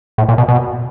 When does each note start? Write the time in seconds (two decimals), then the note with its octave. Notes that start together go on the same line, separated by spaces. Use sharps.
0.18 A2
0.29 A#2
0.38 B2
0.48 B2